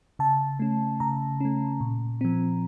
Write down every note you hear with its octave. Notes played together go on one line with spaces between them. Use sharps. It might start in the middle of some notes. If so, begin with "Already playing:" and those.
C#3 A5
A3 C#4
C#3 A#5
A3 C#4
A#2
F3 C4